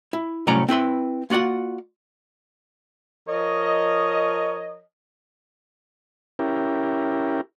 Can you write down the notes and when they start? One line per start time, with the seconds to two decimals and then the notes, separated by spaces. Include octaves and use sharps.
0.13 E4
0.47 C2 A2 F#3 C#4 D5 A#5
0.69 C4 E4 B4 C6
1.30 A#3 F4 F#4 D5 F#5
3.28 F3 A#4 C#5 D#5
6.39 C#4 E4 G4 A#4